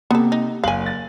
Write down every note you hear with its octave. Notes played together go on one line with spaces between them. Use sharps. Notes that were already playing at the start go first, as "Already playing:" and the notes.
C3 A#3 B3 A4
D#4
F#1 F5 G#5 F#7
A6